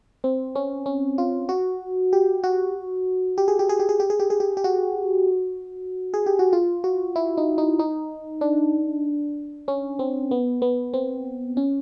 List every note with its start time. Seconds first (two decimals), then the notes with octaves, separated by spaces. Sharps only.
0.24 C4
0.55 C#4
0.86 C#4
1.18 F4
1.49 F#4
2.13 G4
2.44 F#4
3.38 G4
3.48 G#4
3.59 G4
3.69 G#4
3.80 G4
3.89 G#4
4.00 G4
4.10 G#4
4.20 G4
4.30 G#4
4.40 G4
4.57 G4
4.64 F#4
6.14 G#4
6.26 G4
6.39 F#4
6.53 F4
6.84 F#4
7.16 E4
7.37 D#4
7.58 D#4
7.79 D#4
8.41 D4
9.68 C#4
9.99 C4
10.31 B3
10.62 B3
10.94 C4
11.57 C#4